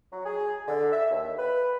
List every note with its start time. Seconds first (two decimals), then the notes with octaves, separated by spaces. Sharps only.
0.13 F#3
0.25 G#4
0.68 D3
0.93 E5
1.11 D#2
1.39 B4